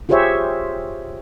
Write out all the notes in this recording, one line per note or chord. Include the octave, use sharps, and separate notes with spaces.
F4 G4 G#4 C5 C#5 E5